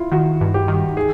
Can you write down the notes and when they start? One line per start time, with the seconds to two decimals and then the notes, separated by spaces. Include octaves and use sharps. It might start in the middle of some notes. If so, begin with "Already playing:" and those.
Already playing: E4 F4
0.12 D#3 F#4
0.41 G2
0.54 G4
0.68 D#3
0.97 G#4